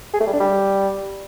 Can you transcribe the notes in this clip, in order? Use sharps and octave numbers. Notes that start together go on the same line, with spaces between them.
G#4
A3
G3
D4
G3